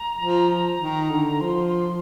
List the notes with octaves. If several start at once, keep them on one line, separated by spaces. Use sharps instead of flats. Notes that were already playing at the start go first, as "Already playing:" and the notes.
Already playing: A#5
F3
D#3
D3
F3 C6